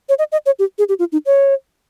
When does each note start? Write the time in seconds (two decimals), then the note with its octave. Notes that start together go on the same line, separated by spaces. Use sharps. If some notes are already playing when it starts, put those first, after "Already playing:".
0.09 C#5
0.19 D#5
0.32 D#5
0.46 C#5
0.59 G4
0.78 G#4
0.89 G4
0.99 F4
1.12 D#4
1.26 C#5